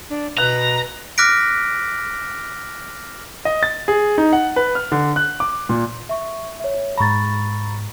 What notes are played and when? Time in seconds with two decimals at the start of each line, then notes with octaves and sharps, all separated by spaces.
0.10 D4
0.37 B2 B4 A#5 F#6 F7
1.18 D6 F6 F#6 A#6 B6 D7
3.45 D#5
3.63 A6
3.88 G#4
4.18 D#4
4.33 F#5
4.56 B4
4.75 F6
4.92 D3
5.16 F#6
5.40 D6
5.69 A#2
6.09 E5 C#6
6.60 C#5 E5
6.98 G#2 A#5 B5 C#6 A6